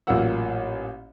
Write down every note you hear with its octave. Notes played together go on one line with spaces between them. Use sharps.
A1 A#2 F#3 A#3 F#5 E6